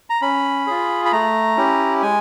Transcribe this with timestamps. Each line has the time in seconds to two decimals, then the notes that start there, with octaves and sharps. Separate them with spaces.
0.10 A#5
0.21 C#4 B5
0.67 F4 G#4
1.05 B5
1.12 A3 A#5
1.57 C#4 E4 G4
2.02 G#3 G#5